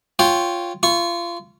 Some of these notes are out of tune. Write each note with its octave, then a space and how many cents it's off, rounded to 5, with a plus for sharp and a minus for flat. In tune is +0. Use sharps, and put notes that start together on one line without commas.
F4 +0 C#5 +0 G5 +0
F4 -25 C#6 +0